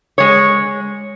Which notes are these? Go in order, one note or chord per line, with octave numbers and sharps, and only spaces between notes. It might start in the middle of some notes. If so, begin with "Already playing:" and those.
G#3 C#5